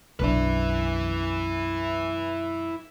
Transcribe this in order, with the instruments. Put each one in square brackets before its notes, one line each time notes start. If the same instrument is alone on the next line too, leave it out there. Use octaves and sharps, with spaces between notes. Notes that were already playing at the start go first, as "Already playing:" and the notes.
[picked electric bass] B1 E3 D4 [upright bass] F#2 B2 [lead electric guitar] E4 B4